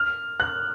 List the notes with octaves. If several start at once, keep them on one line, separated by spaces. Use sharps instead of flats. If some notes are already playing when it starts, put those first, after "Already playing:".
Already playing: F6
F#6